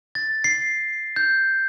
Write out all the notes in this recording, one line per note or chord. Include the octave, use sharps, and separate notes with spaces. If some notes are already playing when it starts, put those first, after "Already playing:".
A6
C7
G6